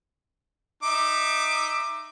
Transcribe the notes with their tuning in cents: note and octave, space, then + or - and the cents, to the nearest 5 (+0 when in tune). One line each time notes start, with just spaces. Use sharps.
D#4 -5 E5 +0 D6 +20